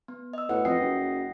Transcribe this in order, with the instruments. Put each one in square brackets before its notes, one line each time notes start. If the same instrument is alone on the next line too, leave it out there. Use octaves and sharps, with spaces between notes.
[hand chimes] B3
D#5 E6
[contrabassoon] A2 [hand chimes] B4 [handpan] F#5
[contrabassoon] F2 [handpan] D#5 [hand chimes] G5 C7
[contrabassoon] F#1